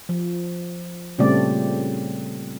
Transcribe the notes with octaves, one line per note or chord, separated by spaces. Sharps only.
F3
A#2 C#3 G3 A3 C4 D5